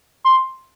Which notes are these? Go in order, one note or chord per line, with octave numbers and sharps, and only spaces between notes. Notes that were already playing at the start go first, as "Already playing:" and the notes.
C6